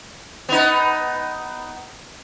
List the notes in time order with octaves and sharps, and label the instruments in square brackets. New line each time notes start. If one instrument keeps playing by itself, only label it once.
[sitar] B3 D#4